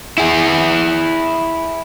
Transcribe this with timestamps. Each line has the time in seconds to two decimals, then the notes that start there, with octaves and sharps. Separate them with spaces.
0.18 E4 G#4